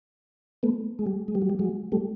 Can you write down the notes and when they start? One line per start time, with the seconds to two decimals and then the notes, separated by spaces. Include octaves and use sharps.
0.63 A3 B3
0.99 G#3
1.07 G3
1.28 G#3
1.35 G3
1.42 F#3
1.50 G3
1.59 F#3 G#3
1.92 G3 A3